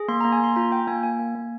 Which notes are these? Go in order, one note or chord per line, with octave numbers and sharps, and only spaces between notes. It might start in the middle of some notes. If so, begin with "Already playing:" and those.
Already playing: G#4
A#3 C6
A#3 A#5
G#5
A#3 C6
F4 A#5
F4 G5
A#3 G#5
A#3 G#5
A#3
A#3